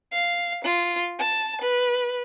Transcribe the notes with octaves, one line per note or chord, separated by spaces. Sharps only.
F5
F4
A5
B4